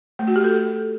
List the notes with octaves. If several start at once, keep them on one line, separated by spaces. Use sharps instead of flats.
A3
F#4
G4
A4